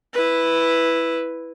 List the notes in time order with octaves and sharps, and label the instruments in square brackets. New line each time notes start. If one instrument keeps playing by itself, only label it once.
[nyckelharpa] E4 B4